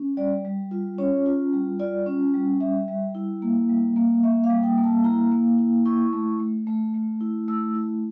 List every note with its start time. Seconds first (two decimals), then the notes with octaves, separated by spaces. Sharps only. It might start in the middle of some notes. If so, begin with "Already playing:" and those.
Already playing: C#4
0.17 G3 D5
0.45 G3
0.71 F4
0.98 C#4 C#5
1.26 F4
1.53 G3
1.80 F4 D5
2.06 C#4
2.34 G3
2.60 G3 E5
2.88 G3
3.15 E4
3.42 A#3
3.69 G3
3.96 A#3
4.23 A#3 E5
4.44 F5
4.50 G3
4.63 G5
4.78 A#3
4.84 A5
5.04 E4 A#5
5.32 A#3
5.58 E4
5.86 E4 C#6
6.13 A3
6.40 A3
6.67 A3
6.94 A3
7.21 E4
7.48 A3 E6
7.75 E4